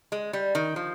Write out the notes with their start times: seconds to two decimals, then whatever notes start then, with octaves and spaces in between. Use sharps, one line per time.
0.12 G#3
0.33 G3
0.55 D#3
0.76 F3